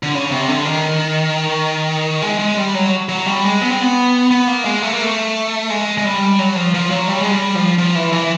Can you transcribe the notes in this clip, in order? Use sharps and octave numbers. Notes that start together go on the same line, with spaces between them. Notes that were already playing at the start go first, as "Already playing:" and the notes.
D3
C#3
C3
D3
D#3
G#3
G#3
G3
F#3
F#3
G3
G#3
B3
C4
B3
B3
A#3
G#3
A3
A#3
A3
G#3
G#3
G3
F#3
F3
F3
F#3
G3
G#3
G3
F3
F3
E3
E3